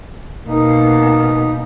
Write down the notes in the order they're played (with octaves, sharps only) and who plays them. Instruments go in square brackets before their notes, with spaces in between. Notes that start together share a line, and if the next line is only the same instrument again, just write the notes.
[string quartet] B2 [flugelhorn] A#3 [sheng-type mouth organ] D#4